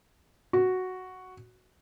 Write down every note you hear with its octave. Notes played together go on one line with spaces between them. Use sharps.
F#4